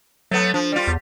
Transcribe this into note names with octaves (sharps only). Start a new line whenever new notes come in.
F#3 A3 B3
F3 D4
G3 F4
E2